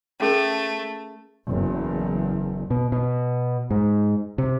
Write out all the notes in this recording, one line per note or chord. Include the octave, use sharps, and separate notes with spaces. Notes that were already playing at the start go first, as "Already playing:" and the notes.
A3 C#4 G#4 A#4
F#1 E2
B2
B2
G#2
C3